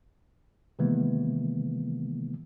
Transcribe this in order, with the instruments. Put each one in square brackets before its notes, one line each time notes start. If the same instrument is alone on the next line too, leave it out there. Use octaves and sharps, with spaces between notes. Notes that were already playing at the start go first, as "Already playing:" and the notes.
[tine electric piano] C3 D#3 E3 G#3 A#3 B3